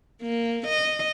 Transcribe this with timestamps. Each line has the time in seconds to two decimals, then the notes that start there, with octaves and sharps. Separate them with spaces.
0.22 A#3
0.67 D#5